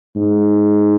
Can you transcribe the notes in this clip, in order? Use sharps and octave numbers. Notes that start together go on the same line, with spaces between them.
G#2